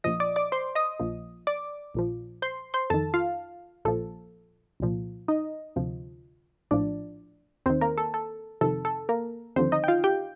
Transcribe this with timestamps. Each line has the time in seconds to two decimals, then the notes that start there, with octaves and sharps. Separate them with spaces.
0.04 A#1 A#2 F3 D#5 D#6
0.20 D5 D6
0.36 D5 D6
0.52 C5 C6
0.75 D#5 D#6
1.00 A#1 A#2 F3
1.47 D5 D6
1.95 A#1 A#2 F3
2.42 C5 C6
2.74 C5 C6
2.90 F2 D#3 A4 A5
3.14 F4 F5
3.85 A#1 A#2 F3 A4
4.80 C2 A#2 F3
5.28 D#4 D#5
5.76 D2 C3 F3
6.71 A#1 A2 F3 D4 D5
7.66 D#2 D#3 C4 C5
7.81 A#3 A#4
7.97 A4
8.14 A4
8.61 F2 C3 D#3 A4
8.85 A4
9.09 A#3 A#4
9.56 D#2 D3 F3 C4 C5
9.72 D#4 D#5
9.84 G5
9.88 F4 F5
10.04 G4 G5